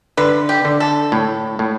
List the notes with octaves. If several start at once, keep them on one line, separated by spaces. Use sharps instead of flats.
D3 B4
G4
D3
A4
A2
A2